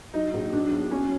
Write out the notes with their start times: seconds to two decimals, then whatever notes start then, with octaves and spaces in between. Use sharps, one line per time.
0.14 F#3 D#4
0.34 A#1
0.53 F#3 D4
0.71 B1
0.91 F#3 C#4